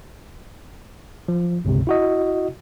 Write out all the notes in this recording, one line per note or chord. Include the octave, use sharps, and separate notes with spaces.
F3
G1 C#2 C3
E4 F#4 D#5